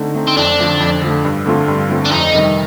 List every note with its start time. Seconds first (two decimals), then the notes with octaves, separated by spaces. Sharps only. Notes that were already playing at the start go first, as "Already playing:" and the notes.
Already playing: D3 A3 C4 D#4
0.15 A3 C4 D#4
0.27 C4
0.37 F2 D4
0.59 D3 F3 A3
0.80 F2
1.02 D3 F3 A3
1.25 G2
1.46 D3 A3 C4 F4
1.68 G2
1.90 D3 A3 C4 F4
2.05 D4
2.11 F2 D#4
2.33 C3 D#3 G3